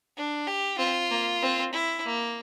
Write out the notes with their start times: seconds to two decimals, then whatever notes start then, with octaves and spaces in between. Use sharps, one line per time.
0.17 D4
0.47 G4
0.78 C4 F4
1.10 A#3
1.42 C4
1.73 E4
2.05 A#3